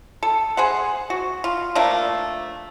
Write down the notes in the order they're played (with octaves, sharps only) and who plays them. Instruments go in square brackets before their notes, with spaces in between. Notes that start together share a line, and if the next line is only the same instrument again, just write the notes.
[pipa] A4
G#4 C5 F#5
F#4
F4
F3 A3 A#3 D4